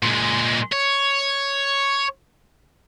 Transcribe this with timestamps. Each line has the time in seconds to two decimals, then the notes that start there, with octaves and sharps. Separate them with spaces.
0.03 A#2 G#3
0.72 C#5